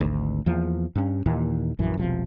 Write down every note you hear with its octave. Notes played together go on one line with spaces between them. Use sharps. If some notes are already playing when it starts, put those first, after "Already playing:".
G#1 D2
E2 F3 A#3
G2 C#4
D#2 A#2 E3
A#1 F#2 E3
E1 B1 C3 F3